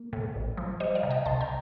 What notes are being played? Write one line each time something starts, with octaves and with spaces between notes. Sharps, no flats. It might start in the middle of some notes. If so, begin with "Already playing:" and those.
Already playing: A#3
A2
A1
F3
G3 C5 D#5
D5 F5
C3
D#5 G5
C2 A5 C6
G5 A#5